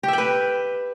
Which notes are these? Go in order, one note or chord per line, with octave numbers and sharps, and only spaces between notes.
G4 B4 E5 G5